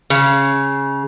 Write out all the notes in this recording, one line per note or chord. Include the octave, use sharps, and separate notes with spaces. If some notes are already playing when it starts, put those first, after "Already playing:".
C#3